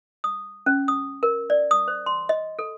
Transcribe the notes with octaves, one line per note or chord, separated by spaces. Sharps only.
D#6
C#4
D#6
A#4
D5
D#6
C5
C6
D#5
A4